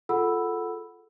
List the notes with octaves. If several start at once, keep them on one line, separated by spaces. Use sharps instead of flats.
F4 G#4 A4 F#5 B5 E6